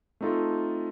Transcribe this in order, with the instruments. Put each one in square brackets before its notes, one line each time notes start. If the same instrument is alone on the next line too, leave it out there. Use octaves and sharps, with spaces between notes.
[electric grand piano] A3 C4 D#4 F4 A4